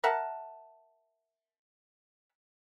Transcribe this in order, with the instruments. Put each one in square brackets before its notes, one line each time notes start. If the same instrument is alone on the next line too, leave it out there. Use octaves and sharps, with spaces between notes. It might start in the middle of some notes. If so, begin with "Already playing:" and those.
[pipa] A#4 E5 F#5 A5